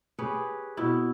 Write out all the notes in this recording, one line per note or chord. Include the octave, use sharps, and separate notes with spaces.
G4 G#4 B4 C#5
B2 C4 E4